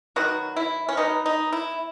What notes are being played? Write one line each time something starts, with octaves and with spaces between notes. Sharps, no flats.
D#3 F#3 B3 F#4
E4
C#4
D#3 F#3 B3 D#4
D#4
E4